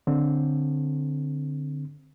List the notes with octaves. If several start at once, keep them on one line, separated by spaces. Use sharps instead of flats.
D3 C4